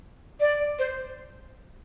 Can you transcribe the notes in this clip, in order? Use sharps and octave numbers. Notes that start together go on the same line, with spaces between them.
D5
C5